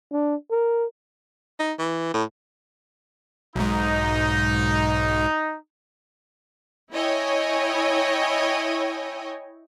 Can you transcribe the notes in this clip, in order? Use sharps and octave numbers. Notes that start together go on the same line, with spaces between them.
D4
A#4
D#4
E3
A2
B1 G#2 D#4
E4 C#5 D#5 G5 G#5